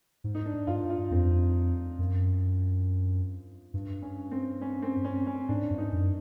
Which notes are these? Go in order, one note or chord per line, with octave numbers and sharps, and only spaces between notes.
G#2
D#4
D4
G2 F4
F4
F2 C4
F#2
G2
C#4
C4
C#4
C4
C#4
C#4
G#2 D4
G2
D#4
F#2